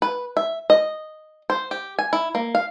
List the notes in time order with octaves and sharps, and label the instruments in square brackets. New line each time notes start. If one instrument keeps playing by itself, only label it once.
[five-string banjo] B4
E5
D#5
C5
G4
G#5
E4
A#3
F5